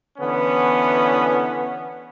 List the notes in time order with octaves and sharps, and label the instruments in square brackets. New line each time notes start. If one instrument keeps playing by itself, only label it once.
[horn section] D3 E3 B3 C#4